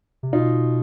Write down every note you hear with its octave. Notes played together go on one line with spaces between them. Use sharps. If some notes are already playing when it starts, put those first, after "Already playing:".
C3
B2 D#4 F4